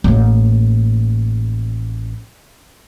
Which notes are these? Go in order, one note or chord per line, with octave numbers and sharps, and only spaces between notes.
A1 A#3